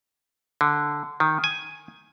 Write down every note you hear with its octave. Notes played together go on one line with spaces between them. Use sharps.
D3
D#3
G#5